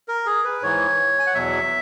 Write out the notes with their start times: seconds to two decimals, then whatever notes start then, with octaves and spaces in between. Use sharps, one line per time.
0.08 A#4
0.26 G#4
0.44 B4
0.62 G#2 E3 C#5
1.19 G#5
1.27 F#5
1.34 E2 B2 F#3 E5